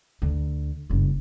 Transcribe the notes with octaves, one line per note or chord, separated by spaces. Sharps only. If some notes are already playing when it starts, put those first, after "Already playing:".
D2
F#1 G2